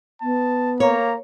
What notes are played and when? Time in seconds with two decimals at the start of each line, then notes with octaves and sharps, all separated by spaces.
0.22 B3 A5
0.80 A#3 C#5 A#5